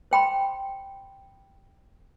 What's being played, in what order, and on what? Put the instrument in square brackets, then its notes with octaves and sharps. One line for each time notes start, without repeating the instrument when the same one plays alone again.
[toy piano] C5 G5 B5 C6